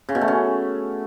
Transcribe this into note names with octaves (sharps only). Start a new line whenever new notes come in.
C#3
B2
A3
C#4